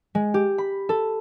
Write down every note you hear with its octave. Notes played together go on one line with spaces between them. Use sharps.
G#3
G4
B5
A4